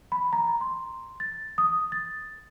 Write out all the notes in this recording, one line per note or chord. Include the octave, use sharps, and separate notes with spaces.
B5
A#5
C6
A6
D#6
A6